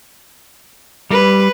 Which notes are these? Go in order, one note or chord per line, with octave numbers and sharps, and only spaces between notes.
G3 B4